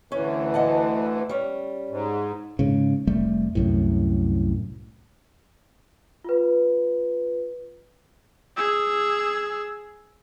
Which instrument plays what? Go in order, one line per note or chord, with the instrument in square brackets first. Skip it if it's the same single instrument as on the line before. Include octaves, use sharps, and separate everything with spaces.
[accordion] D2 E3 [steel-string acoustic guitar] C#4
[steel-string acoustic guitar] D#5 F#5 A5
G3 C#4
[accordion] G#2
[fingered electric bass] G#2 C#3
F1 G3 A3
C2 F#2 A2
[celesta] F4 B4
[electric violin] G#4 E6